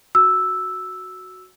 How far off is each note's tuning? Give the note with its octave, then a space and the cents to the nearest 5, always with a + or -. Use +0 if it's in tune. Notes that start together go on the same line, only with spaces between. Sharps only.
F#4 +0 E6 -5